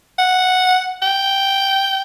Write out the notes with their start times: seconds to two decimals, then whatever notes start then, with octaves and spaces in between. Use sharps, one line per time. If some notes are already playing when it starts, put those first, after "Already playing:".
0.19 F#5
1.02 G5